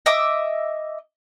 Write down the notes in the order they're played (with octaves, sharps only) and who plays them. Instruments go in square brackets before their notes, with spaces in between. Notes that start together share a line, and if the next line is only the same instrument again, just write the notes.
[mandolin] D#5 E5 D6